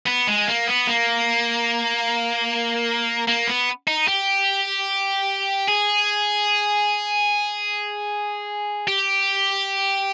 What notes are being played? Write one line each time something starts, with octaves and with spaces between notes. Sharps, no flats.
B3
G#3
A#3
B3
A#3
A#3
B3
D#4
G4
G#4
G4